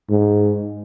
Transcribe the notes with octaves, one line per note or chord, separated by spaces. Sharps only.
G#2